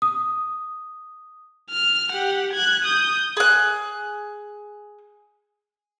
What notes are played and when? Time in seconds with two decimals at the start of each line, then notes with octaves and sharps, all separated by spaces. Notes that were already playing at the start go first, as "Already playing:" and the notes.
0.02 D#6
1.71 F6
2.12 G4 F#5
2.53 F#6 G#6
2.85 D#6 G6
3.37 G#4 F#6